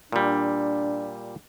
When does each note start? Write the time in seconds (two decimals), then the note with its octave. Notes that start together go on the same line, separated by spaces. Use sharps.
0.12 A#2 G3 D4